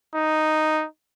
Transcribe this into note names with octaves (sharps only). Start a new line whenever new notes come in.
D#4